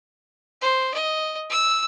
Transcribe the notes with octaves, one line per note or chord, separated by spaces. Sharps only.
C5
D#5
E6